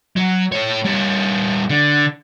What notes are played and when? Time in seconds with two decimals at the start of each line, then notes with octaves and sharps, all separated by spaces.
0.17 F#3
0.52 A3 C#5
0.84 G3 C#4
1.69 D3